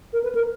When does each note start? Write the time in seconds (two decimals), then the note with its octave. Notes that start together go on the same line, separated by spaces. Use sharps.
0.13 A#4
0.24 B4
0.35 A#4